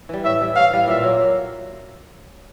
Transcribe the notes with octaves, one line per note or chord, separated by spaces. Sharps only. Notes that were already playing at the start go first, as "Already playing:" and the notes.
E3 G3
A2 E5
E3 G3
A2 F5
E3 G3
A#2 E5
F#3 A#3